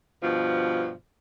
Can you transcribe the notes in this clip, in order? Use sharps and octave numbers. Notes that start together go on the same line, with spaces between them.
G2 B2 F3